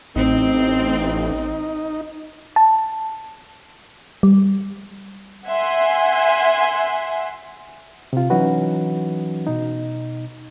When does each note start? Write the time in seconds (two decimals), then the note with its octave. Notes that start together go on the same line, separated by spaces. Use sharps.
0.16 A1 C4 D#4
2.56 A5
4.23 G3
5.46 E5 F#5 G#5 C6
8.13 C3 F4
8.30 E3 F#3 C#4 D#4 F#4 B4
9.47 B2 D#4